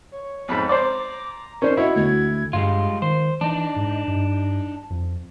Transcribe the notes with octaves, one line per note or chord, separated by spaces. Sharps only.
C#5
F2 G#2 B5
C5 D5 A#5 D6
C#4 D#4 A#4 C5 D5
E4 F#4 C#5 D#5
D2 G#6
G2 G3 G#3 F4
D#3 C5
E3 D4 D#4
G#2
G2
F2